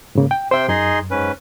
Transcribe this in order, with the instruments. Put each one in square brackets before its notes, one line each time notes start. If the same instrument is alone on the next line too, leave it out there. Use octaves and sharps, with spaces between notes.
[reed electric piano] G#2 C#3 A#3
G5
[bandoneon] C3 G5 C6 [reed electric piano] C5 E5
[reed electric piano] F#2 [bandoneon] D#4 G#4 C6
[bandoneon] G#2 C#4 B4